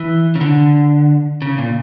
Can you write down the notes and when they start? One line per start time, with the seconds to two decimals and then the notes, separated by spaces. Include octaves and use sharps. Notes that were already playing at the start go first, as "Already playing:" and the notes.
Already playing: E3
0.35 C#3
0.41 D3
1.42 C#3
1.58 A#2